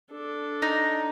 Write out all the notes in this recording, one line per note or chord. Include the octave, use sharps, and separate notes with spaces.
D4 A4
D#4